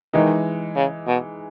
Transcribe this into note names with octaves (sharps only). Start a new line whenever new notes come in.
D#3 E3 G#3 D#4
C#3
B2